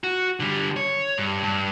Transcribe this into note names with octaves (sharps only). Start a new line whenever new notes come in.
F#4
D3 G3
C#5
G2
G2